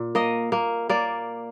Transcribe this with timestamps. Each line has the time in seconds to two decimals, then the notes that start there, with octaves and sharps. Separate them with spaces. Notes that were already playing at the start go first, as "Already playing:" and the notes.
Already playing: A#2
0.15 A#3 D#5
0.52 A#3
0.89 A#3 D5